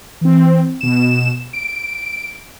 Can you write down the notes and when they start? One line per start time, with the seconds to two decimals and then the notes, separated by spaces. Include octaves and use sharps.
0.21 E3 C4
0.81 B2 E7
1.53 D7